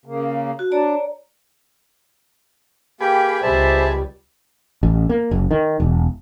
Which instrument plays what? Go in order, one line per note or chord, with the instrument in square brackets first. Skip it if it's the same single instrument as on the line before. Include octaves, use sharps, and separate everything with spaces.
[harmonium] C#3 A#3
[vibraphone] F#4
[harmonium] D4 [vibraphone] C#5 D5 A#5
[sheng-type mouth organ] A#3 G4 G5 [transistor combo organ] G#4 B4
[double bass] C#2 G3 [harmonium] C5 D5 E5 [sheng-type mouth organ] A5
[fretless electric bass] A1
A#3
F#1
D#3
E1